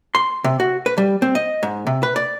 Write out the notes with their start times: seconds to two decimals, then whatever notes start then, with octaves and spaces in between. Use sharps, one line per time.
0.15 C6
0.44 C3
0.60 F#4
0.86 B4
0.98 G3
1.22 C4
1.35 D#5
1.63 G#2
1.87 C3
2.03 B4
2.16 D5